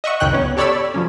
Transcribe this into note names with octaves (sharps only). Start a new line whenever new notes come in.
D#5 E5 F#5 C#6
C#2 F#2 D#3 G5 F#6
B3 C#4
G4 A4 C#5 D5 B5 E6
F3 F#3 C#4